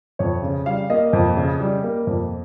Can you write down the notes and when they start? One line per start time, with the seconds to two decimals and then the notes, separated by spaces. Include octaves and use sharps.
0.19 F2 C#5
0.43 C#3
0.66 G3 F5
0.90 A#3 D#5
1.13 F2
1.37 C#3
1.60 G3
1.83 A#3
2.07 F2